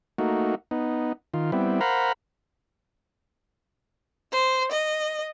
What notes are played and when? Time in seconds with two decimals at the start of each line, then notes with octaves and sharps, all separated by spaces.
0.18 A3 A#3 D#4 F#4
0.71 B3 D#4
1.34 D#3 F4
1.52 G3 B3 C4 E4
1.81 A#4 C5 F5 F#5 A#5 B5
4.30 C5
4.70 D#5